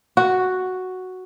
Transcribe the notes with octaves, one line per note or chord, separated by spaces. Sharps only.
F#4